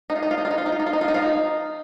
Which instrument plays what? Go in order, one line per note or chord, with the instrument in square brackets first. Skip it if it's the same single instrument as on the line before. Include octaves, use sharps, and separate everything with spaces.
[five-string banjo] D#4
F4
D#4
F4
D#4
F4
D#4
F4
D#4
F4
D#4
F4
D#4
F4
D#4
F4
D#4